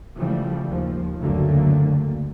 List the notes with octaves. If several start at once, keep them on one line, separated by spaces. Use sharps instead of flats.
C#3 E3 F3 G3 A3
D#2 F3
F#1 D2 D3 F#3 A3 A#3